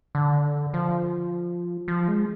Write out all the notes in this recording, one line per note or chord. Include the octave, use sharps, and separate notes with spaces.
D3
F3
F3
G#3